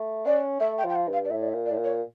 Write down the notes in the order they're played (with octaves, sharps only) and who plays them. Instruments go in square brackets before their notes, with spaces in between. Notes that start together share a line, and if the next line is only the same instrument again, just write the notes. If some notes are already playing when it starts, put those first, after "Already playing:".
Already playing: [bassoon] A3
[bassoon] C#4 [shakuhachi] D5
[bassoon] A3 [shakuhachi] E5
[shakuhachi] G5
[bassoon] F3
[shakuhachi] G5
F5
[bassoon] G2
[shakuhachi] F5
D5
[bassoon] A2 [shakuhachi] E5
[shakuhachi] D5
E5
[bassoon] A#2
[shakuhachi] D5
[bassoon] A2
A#2
[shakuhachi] C#5